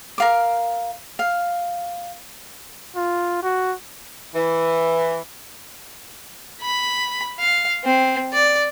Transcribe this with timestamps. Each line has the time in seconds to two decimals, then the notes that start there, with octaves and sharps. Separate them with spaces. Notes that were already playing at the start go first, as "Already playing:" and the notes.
0.18 A#4 F5 D6
1.19 F5
2.96 F4
3.43 F#4
4.35 E3
6.61 B5
7.40 F5
7.85 C4
8.34 D5